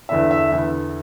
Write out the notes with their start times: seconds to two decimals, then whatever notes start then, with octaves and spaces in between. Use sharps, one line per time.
0.09 E2 D3 B3 D4 E5
0.31 E5
0.52 E2 D3 B3